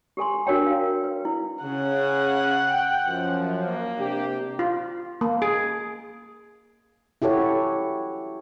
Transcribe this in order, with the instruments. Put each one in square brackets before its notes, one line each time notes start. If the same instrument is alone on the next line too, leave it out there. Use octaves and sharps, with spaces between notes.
[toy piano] G4 A4 G#5 C6
D4 F#4 A#4 C#5 G5 A#5
F5
A#4
B4
E4
[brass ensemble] C#3 [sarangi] F#5
[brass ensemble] G5
F#2 F3
[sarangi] A#3
[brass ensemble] C3 D4 G4
[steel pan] F4
A#3
G#4
[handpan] E4 F#4 G4 A4 C#5